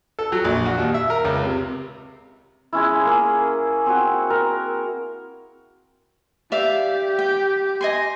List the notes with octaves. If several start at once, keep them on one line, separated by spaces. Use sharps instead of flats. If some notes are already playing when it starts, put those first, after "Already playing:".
A4
F#3
A#1
F#4
D#2
E5
A#4
C#2
C3
G#3 C#4 E4
A#3 C#4 G#4
C4 F#4
A#4
G4 D5 E5 F5
G5
D#5 G#5 C6